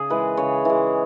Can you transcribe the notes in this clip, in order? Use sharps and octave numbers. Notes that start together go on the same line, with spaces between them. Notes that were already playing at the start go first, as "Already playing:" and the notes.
Already playing: C#3 G#4
E3 G#3 B4
C#3 C#5
E3 G#3